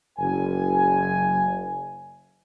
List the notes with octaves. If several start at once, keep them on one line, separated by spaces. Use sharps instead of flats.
F#1 G#5